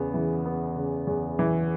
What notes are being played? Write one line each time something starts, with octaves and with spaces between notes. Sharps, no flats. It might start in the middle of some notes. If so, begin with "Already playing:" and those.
Already playing: E2 C#3 B3
E3
B3
C#3
E2
E3